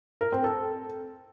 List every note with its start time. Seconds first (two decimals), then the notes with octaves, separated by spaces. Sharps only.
0.21 A#4
0.32 C4
0.44 A4